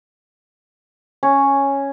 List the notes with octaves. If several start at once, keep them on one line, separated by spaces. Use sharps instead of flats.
C#4